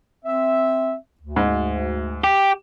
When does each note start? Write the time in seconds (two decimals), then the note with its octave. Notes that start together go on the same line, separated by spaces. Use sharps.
0.25 C4 E5
1.21 D2
1.36 G#2
2.24 G4